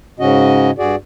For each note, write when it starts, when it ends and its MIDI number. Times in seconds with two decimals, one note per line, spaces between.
0.20 0.71 44
0.20 0.71 49
0.20 0.71 61
0.20 0.71 66
0.20 0.71 75
0.78 0.96 43
0.78 0.96 66
0.78 0.96 68
0.78 0.96 74